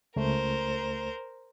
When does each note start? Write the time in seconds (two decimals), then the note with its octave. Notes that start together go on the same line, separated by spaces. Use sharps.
0.16 C#2 A3 A#4 C5